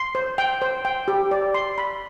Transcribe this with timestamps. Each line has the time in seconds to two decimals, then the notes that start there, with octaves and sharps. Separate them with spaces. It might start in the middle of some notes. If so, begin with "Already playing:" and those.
Already playing: C6
0.15 C5
0.38 G5
0.62 C5
0.85 G5
1.08 G4
1.31 D5
1.54 C6
1.78 B5